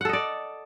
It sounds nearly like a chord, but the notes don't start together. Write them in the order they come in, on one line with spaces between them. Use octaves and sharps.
F#5 A4 D#5 D5